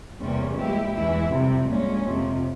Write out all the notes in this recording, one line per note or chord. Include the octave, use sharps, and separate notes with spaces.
E2 C3 G3 A#3 C#4
A#2 G#3 E4 G4
E2 E3 G#3 E4
F2 C3 G3
A#2 G#3 C#4
F2 C3 F3